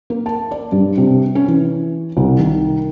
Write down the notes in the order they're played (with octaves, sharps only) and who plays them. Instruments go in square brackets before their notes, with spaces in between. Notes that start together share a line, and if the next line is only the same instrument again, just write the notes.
[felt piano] A#3
A5
D5
G2
C3
C#4
E3
C2
D#3